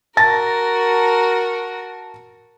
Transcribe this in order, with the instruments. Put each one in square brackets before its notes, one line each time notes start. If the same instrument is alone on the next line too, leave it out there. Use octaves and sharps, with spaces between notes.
[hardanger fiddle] F#4 A#4 [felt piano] A5 A6 A#6